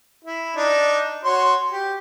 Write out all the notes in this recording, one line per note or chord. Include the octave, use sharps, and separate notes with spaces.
E4
D4 D#4
F#4 C#5 C6
G4